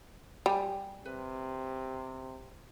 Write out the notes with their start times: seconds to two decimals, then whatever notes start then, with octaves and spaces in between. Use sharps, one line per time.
0.46 G3 G4 G5 G#5
1.05 C3 B4